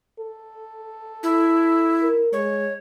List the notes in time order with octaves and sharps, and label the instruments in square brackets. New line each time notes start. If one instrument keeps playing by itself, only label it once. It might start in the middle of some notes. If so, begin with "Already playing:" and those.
[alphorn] A4
[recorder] E4
[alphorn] A#4
[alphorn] G#3 [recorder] C#5